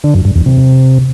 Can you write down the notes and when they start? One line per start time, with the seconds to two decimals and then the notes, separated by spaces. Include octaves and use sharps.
0.04 D3
0.14 F#2
0.25 G2
0.35 E2
0.46 C3